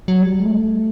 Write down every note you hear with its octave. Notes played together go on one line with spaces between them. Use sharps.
F#3
G3
G#3
A3